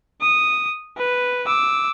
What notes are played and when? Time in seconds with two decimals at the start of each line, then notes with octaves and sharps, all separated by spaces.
0.21 D#6
0.97 B4
1.47 D6 E6